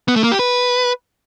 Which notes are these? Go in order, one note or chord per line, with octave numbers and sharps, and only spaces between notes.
B3
A3
A#3
G4
B4